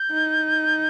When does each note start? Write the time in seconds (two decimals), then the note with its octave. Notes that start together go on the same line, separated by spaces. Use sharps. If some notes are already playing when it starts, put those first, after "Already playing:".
Already playing: G6
0.11 D#4